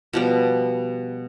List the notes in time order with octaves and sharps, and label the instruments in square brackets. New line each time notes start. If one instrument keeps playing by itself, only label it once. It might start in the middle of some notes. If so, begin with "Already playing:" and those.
[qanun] B2 F3 G3